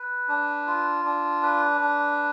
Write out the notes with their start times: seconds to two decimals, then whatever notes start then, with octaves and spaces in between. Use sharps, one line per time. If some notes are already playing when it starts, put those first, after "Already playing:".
Already playing: B4
0.28 D4
0.67 F4
1.05 D4
1.43 B4
1.81 D4